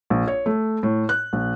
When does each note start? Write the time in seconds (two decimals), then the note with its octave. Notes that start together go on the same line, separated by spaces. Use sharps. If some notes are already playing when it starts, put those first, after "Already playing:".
0.10 A#1
0.28 C#5
0.46 A3
0.83 A2
1.09 F#6
1.33 A#1